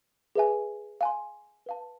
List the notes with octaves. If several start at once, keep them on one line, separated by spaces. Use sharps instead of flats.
G#4 B4 E5 G#5
F5 G#5 C6
B4 F5 A5